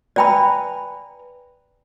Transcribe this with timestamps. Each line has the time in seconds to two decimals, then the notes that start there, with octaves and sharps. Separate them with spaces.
0.16 B4 D5 G5 G#5 A#5 B5